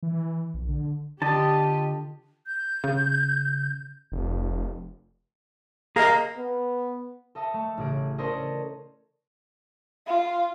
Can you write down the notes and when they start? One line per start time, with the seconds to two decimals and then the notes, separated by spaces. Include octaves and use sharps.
0.03 E3
0.54 A#1
0.69 D3
1.22 D3 F4 G4 D#5 A5
2.47 G6
2.84 C#3
4.12 F1
5.96 A#3 G#4 D#5 A#5 F6
6.37 B3
7.35 A4 D#5 E5 A5
7.54 A3
7.78 A1 C#3 G#4 D7
8.18 C#4 A4 A#4 C5 D5 D#5
10.07 F4